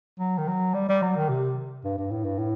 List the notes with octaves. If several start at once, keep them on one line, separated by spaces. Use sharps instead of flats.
F#3
D#3
F#3
G3
G3
F#3
D#3
C3
G2
G2
A2
G2
A2